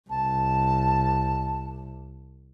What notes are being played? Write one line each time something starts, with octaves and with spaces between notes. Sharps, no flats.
C2 A5